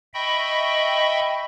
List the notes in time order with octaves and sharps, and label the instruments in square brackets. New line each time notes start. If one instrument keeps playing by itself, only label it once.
[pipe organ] D#5 E5 G5 B5 C#6